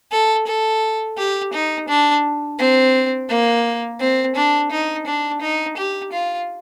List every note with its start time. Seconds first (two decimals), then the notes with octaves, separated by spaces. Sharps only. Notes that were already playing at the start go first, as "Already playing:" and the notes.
0.11 A4
0.47 A4
1.17 G4
1.53 D#4
1.88 D4
2.59 C4
3.29 A#3
4.00 C4
4.36 D4
4.71 D#4
5.06 D4
5.42 D#4
5.77 G4
6.12 F4